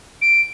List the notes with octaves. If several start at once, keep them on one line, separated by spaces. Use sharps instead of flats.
D7